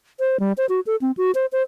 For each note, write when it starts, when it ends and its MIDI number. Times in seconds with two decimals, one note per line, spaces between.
0.20 0.37 72
0.40 0.53 55
0.58 0.66 72
0.69 0.80 66
0.87 0.96 69
1.01 1.11 60
1.17 1.31 66
1.35 1.46 72
1.52 1.62 72